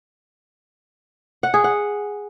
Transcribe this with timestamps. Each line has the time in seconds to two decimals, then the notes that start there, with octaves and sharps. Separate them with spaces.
1.43 F#5
1.54 G#4
1.64 F#5